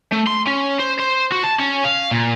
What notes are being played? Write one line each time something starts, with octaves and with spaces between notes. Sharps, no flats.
A3
C6
C#4
C5
C5
F#4
A5
C#4
F5
A#2